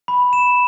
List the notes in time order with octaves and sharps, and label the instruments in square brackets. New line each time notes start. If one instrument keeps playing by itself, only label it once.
[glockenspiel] B5
E7